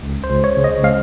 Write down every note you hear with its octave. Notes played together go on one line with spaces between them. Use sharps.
C#2
C5
C#2
C#5
C#3
D#5
G#3 F5